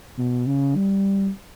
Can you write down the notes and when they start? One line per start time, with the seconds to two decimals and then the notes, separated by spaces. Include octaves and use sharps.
0.18 B2
0.47 C#3
0.75 G3